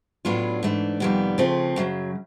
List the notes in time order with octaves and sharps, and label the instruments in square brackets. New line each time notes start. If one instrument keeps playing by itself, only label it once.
[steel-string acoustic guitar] A2 F#3 B3 D4 F4
G#2 E3 A3 D4
F2 C3 D#3 G3 B3
C#3 F3 A3 C4
F#2 C#3 F#3